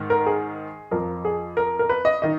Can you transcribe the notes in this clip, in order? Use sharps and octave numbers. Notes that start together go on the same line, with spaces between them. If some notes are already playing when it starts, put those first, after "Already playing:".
Already playing: G#2 D#3
A#4
G#4
F2 F3 A#4
G#4
A#4
A#4
B4
D#5
D#3 D#5